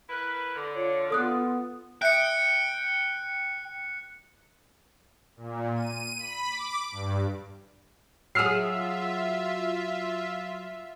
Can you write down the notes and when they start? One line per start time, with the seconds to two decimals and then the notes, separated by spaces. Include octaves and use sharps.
0.09 E4 A#4 B4
0.56 D3
0.74 F4 C#5
1.10 B3 A4 D#6 F#6
2.02 E5 G5 D#6 F#6 C#7
5.37 A#2
5.75 D#7
6.18 B5
6.50 D6
6.91 G2
8.35 F#3 F4 G#4 E5 E6 F6 C7